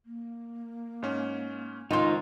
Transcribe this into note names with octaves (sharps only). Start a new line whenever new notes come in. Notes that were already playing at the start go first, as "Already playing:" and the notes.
A#3
G#2 C#4
C#2 D#3 D#4 F4 C5